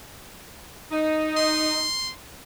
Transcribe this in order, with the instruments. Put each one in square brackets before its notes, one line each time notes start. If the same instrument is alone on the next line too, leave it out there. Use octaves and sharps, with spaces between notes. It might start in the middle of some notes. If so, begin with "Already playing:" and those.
[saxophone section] D#4
[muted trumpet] C6